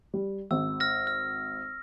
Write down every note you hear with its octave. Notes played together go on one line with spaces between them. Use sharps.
G3
G#1 E6
F6 A#6
F6